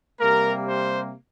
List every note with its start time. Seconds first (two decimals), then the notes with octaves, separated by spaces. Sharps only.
0.19 C3 G3 A#3 A#4
0.67 C5